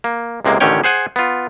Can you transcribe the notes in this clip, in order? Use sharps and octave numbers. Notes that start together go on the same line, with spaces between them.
A#3
C#2 C3 G#3 A#3
A1 D3 D#3 C#4 C#5 G5
G#4 C5 F#5 G#5
B3 F4